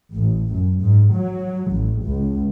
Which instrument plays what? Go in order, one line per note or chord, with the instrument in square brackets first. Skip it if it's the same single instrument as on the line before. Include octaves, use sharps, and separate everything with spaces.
[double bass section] A1
F#2
G#2
F#3
A1
C#2